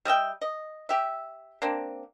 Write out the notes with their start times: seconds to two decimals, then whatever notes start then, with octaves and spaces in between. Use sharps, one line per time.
0.05 G3 D#5 E5 G5
0.41 D#5
0.89 G4 E5
1.62 A#3 C4 D4